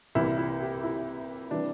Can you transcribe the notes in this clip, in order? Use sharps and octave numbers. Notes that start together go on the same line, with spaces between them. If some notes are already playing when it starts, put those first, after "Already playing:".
C2 C3 E3 G3 E4
E4
G4
E4
C3 E3 G3 D4